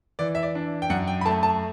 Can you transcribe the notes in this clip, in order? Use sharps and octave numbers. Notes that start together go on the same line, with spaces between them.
E3 D5
E5
D5
D4
G5
F#2 F#5
G5
B5
A3 A5
A5